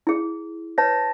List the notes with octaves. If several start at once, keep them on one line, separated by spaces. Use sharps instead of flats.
E4 G#4
B4 C#5 A5 A#6